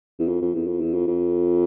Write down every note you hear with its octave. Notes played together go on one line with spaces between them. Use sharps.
E2
F2
F2
E2
F2
E2
F2
F2